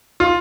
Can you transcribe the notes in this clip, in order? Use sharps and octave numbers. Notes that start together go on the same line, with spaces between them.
F4